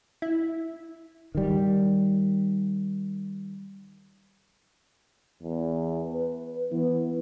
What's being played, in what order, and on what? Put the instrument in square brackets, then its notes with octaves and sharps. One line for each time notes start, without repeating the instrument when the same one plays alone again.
[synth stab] E4
[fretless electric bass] D#3 G3
[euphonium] E2
B4
[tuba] E3 [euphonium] B3